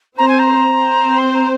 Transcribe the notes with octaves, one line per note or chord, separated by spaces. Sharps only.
C4 C5 A#5
G#5
A#5
C4 C5
C6
A#5